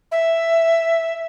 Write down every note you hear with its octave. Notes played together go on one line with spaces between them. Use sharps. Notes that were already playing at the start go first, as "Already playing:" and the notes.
E5